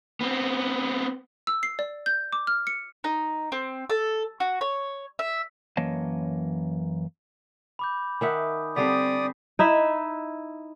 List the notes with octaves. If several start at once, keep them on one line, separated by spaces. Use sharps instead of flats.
B3 C4
E6
C7
D5
G6
D6
F6
C#7
D#4
C4
A4
F#4
C#5
E5
F#2 E3 A#3 C#5 D#5 A5
B5 D6 G6
D#3 E5 F#5 G#5 D#6
D3 G3 C4 D4 D5 D#6 B6 C7
D#4 E4 E5